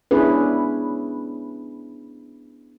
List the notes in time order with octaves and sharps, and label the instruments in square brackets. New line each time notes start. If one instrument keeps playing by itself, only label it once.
[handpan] B3 C#4 D4 E4 G#4 B4